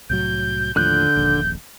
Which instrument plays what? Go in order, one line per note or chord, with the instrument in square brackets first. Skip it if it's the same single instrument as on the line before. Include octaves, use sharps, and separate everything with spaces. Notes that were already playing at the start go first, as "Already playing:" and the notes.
[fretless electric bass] C2 A2 F#3 [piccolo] G6
[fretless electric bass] D#2 A2 F3 [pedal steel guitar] D3 F#6 [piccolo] G6
[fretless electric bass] D#1 A#1